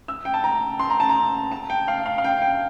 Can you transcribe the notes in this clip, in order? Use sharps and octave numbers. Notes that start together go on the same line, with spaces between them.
E6
G5
A5
A#5
C6
A#5
A5
A#5
A5
G5
F5
F5
F5
G5
G5